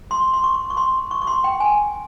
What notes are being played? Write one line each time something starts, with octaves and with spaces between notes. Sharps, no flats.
C6
C6
C#6
C#6
C6
C#6
C#6
C6
G5
G#5